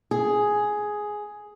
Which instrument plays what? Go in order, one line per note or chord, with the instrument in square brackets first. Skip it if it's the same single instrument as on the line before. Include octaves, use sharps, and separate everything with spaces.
[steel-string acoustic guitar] G#4